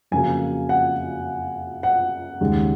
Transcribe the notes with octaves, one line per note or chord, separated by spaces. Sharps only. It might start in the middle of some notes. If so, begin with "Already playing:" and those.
F2 C#3 F#3 A#3 G#5
F#5
F#5
D#2 C#3 G#3